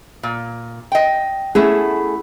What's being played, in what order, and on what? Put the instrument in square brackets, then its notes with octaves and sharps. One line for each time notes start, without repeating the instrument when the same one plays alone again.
[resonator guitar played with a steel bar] A#2
D#5 G5
[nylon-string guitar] A3 G#4 [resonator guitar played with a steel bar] B3 C#4 E4